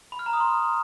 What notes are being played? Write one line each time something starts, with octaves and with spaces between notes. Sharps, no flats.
B5
F6
A#5
D#6
C6